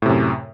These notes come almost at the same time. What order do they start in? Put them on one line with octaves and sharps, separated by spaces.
A2 C3 F#2